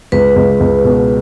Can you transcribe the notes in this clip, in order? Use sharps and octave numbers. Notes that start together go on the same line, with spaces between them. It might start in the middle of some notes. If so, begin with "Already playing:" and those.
C#2 B4
C#2
C#2
B2